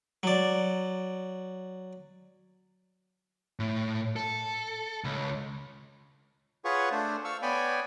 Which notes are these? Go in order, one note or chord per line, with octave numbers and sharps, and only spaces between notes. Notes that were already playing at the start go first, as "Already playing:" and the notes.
F#3 D5
A2
A4
C#2
F4 G#4 B4 C#5 F#5 C#6
A3 D4 C5
F5 C#6 E6
B3 C#5 D5 G5 G#5 B5